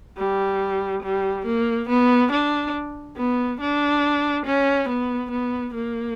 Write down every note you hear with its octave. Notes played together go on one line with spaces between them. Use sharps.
G3
G3
A#3
B3
D4
B3
D4
C#4
B3
B3
A#3